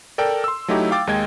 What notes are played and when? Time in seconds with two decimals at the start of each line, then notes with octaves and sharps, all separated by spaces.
0.18 A4 A#4 D5 G5
0.44 C6 E6
0.68 F#3 A3 D#4 E4 G4
0.91 F5 G5 D6 A6
1.07 D#2 G#3 D#5 G5 G#6